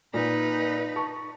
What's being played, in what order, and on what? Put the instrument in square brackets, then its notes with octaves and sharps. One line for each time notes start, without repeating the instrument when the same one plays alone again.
[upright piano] A#2 [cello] D#4 B4
[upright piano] A5 C#6